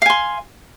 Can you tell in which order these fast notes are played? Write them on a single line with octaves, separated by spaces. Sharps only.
F5 G#5 C6